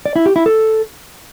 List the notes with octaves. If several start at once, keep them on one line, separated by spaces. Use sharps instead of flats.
D5
E4
G4
E4
A4